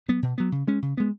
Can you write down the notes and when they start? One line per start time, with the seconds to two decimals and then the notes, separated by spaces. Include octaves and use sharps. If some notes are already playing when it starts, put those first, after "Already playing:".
0.08 F#3 B3
0.22 B2
0.38 F#3 B3
0.52 C#3
0.67 G#3 C#4
0.82 C#3
0.97 G#3 B3